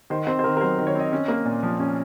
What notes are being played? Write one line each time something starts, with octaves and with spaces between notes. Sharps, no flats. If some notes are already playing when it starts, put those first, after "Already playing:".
D#3 C5
C4 C5
C5
D#3 A#4
A#4
F#3 C5
D#3
C#5
C4 D#5
C#4
A#3
A#2
F3
C#4